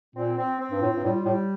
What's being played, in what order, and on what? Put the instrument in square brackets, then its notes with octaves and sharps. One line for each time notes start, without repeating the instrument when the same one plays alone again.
[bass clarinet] A#2 [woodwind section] C4
[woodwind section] C4
C4
[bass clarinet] G2
[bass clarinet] A2 [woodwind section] F4
[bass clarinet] G2
[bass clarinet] A2 [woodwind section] G3
[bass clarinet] A2 [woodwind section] G3